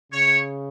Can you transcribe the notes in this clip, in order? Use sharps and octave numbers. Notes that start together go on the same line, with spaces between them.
C#3 C#5